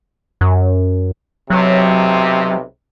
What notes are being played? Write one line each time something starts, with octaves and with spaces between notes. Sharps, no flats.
F#2
B1 C3 F#3